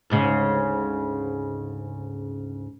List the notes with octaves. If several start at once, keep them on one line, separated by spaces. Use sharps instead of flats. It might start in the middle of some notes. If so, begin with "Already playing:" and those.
D2 G#2 C#3